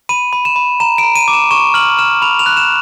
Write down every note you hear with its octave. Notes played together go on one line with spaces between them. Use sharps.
B5 D#7
B5
E7
B5
A#5 E7
D7
A#5
D#7
D6
E7
C#6 E7
F6 F#7
F6 E7
B5 F7
F7
F#6
E7